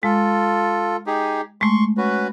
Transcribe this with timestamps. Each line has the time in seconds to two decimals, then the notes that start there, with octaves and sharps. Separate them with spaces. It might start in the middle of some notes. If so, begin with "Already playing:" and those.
0.03 G#3 F4 A4
1.07 D#4 G4 G#4
1.61 G#3 A3 C6 C#6
1.97 C#4 F#4 B4